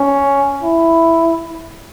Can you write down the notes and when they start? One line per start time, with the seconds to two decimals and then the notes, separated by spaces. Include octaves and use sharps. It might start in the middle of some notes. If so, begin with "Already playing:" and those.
Already playing: C#4
0.63 E4